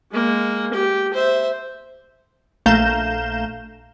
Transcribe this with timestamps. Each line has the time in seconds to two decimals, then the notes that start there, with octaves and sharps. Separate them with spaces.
0.12 G#3 A#3
0.73 G4
1.13 C5 E5
2.66 A#1 A3 F5 A#5 G6 E7